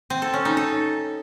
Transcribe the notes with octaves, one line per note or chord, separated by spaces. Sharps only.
C4
A4
C#4
D#4
A4